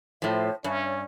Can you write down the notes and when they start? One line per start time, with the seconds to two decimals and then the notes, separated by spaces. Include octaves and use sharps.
0.22 A2 F3 C5 C#5 E5
0.64 G2 C#4 C#5 D5 E5